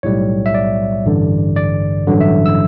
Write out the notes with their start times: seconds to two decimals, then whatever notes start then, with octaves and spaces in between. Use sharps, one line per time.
0.03 B1 A2 G3 C#5
0.46 E5
0.54 D5
1.06 A1 G2 D3
1.56 D5
2.07 A1 G2 D3 F#3
2.21 E5
2.46 E6